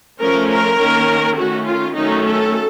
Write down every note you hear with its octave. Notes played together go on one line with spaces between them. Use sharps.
F3 A3 C#4 A#4
A#4
D#3 A#3 C#4
D#3 A3 C#4 F#4
F4
D#3 F#3 A3 C#4 D#4
A4